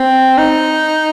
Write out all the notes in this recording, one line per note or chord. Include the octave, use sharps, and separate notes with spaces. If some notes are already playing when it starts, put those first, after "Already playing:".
Already playing: C4
D#4